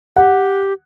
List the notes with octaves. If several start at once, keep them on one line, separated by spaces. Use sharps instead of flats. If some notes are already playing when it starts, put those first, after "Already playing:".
G4 F#5